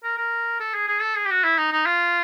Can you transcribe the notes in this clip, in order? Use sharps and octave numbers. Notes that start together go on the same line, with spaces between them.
A#4
A#4
A4
G#4
G#4
A4
G#4
G4
F#4
E4
D#4
D#4
F4